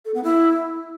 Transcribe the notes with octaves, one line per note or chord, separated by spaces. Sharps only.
A4
B3
E4